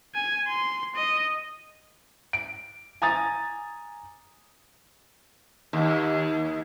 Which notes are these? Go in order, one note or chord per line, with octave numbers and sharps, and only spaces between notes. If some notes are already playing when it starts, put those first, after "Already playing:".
G#5
C6
D#5
D7
G#5 A#5 D#6 A6
D#2